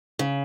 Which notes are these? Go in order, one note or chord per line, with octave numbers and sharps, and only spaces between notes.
C#3